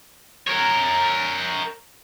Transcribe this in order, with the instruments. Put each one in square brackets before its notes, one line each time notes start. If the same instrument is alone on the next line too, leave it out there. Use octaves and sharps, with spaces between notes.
[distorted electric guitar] A#4 C#5